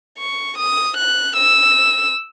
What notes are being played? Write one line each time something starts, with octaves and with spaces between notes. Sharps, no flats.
C#6
D#6
F#6
E6